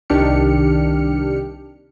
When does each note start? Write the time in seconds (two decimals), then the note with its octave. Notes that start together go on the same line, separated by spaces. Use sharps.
0.10 C2 D#3 D4 G4 F6 C#7